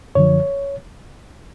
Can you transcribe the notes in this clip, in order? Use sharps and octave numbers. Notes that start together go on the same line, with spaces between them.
F#2 D3 F3 C#5